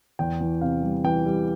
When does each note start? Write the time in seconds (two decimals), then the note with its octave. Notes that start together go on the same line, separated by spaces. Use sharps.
0.19 E2 G5
0.41 E3
0.61 C3 F5
0.83 G3
1.04 E3 G5
1.26 G3